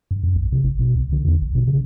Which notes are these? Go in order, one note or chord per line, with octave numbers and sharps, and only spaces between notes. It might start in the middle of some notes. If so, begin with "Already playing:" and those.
G2
F#2
B1
C3
A1
B2
C2
D3
E2
A#1
B2
C#3